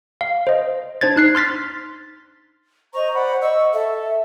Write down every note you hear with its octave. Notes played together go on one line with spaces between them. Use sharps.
F5
C5 D#5
D4 C5 G#6 A6
D#4 F#6 C7
C6 F6 A6 B6
C5 D#5 A#5 C#6
D5 F#5 B5
D#5 F#5 C#6 E6
A4 E5